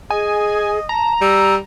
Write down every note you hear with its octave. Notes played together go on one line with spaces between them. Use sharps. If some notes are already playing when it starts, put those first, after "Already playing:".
G#4 D#5 G#5
A5 A#5
G3 E6